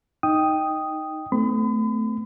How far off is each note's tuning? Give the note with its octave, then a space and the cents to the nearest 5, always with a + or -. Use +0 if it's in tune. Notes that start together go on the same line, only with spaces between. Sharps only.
D#4 +0 G5 +0 D#6 +0
A3 +0 C4 -40 B5 +40